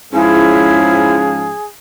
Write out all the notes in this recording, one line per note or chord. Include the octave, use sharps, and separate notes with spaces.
G#2 F3 C#4 E4 G#4